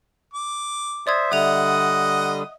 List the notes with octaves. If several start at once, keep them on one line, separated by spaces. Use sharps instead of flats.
D6
C5 D5 E5 D#6 G#6
D3 G3 D#5 E5 F#5 D#6 F7